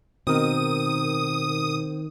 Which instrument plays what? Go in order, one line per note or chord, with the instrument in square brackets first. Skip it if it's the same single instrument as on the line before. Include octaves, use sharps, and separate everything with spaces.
[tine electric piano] B2 A#4 [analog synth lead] D#3 [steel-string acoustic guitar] C4 [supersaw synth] D#6